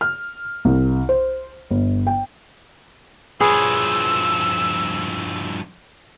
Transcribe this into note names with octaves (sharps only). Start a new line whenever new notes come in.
F6
C2
C5
G1
G5
G2 F3 G#4 B4 C#5 E6